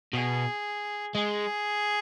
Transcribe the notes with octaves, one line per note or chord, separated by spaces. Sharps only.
B2 G#4
G#3 G#4